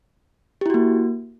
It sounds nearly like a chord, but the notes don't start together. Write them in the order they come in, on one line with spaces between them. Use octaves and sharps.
G4 E4 F#4 A#3